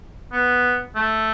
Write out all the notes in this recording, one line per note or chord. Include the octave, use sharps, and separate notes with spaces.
B3
A3